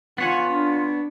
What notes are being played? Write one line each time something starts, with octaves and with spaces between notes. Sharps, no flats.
B3 F4 C#5 F#5 G#5
D4